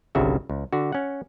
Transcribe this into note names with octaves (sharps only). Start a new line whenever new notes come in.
G1 C2 G2 C#3 F#4 E5
C#2
D3 F#4
C#4 F#5